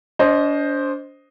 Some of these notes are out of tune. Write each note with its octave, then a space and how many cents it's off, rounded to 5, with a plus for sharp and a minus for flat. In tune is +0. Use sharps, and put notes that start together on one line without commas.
D4 -40 C5 +5 D#5 +0